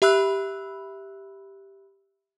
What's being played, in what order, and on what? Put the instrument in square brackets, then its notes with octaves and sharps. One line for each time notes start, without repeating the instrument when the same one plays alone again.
[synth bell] G4 E5 B5 E6 F#6